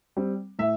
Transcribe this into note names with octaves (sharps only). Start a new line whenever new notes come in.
G3 C4
A2 E5